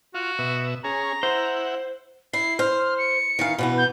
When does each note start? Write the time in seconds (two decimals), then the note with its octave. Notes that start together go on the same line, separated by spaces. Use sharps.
0.14 F4 F#4
0.39 B2 E5
0.84 C#4 G#4 A#5
1.23 E4 C5 F#5
2.33 E4 C7
2.59 C5 F6
2.98 C#7
3.39 D#3 E3 F5
3.58 B2 E3 B3
3.78 G6